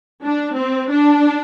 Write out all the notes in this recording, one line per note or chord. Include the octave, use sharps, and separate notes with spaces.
D4
C4
D4